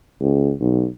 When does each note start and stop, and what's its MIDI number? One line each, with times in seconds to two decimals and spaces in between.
0.20 0.52 37
0.60 0.86 35